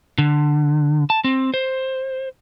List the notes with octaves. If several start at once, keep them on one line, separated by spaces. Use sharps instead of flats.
D3
A5
C4
C5